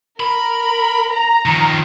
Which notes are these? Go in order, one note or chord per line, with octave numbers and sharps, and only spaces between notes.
A#4 B5
A#5
D#3 F3